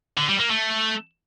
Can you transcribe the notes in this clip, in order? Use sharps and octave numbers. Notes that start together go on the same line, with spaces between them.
D3
G3
A#3
A3